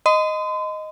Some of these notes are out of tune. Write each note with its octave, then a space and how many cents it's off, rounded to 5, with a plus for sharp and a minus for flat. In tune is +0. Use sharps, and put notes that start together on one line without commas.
D#5 +0 C6 -40